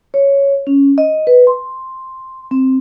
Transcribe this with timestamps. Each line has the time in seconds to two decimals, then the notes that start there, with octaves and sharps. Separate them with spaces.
0.14 C#5
0.67 C#4
0.98 D#5
1.27 B4
1.47 C6
2.51 C4